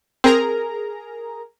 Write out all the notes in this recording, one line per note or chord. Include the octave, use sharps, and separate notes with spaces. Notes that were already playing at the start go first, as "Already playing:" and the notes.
C4 G#4 A#4 A#5